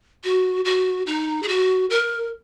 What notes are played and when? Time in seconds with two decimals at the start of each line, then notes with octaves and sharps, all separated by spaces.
0.24 F#4
0.65 F#4
1.07 D#4
1.43 G#4
1.48 F#4
1.90 A#4